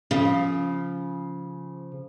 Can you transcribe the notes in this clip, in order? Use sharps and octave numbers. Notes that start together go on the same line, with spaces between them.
C#3 F3